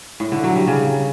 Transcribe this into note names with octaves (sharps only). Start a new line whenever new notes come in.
A2
D3
F#3
G3
C#3